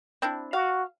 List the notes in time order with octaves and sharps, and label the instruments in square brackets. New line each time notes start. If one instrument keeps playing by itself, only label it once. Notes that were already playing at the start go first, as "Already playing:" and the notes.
[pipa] C4 D4 E4
[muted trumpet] F#4 [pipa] F5